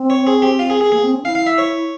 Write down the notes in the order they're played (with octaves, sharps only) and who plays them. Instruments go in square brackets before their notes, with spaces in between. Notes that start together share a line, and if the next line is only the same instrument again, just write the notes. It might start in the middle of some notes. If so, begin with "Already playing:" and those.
Already playing: [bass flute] C4
[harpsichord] C#5
G#4
G4
F4
G#4
G#4
[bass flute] A#3 [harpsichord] G#4
[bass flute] C4
C#4
[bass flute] E4 [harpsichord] F5
[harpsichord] F5
E5
C#5